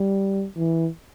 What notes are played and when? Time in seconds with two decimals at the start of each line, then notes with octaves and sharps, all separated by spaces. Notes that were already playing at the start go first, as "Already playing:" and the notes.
Already playing: G3
0.57 E3